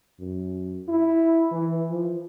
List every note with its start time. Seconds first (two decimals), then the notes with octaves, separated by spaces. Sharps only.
0.20 F#2
0.88 E4
1.52 E3
1.90 F3